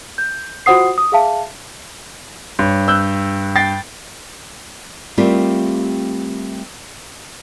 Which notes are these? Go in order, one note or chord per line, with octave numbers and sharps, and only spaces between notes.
G6
F4 F#4 C5 F#5 D#6 C7
D#6
G#4 E5 F5 A5
G2 C#5
E6 F#6 G6
G5 A6 C7
G3 A3 C4 F4 G4 A#4